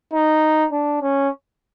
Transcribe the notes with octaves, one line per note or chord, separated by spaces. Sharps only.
D#4
D4
C#4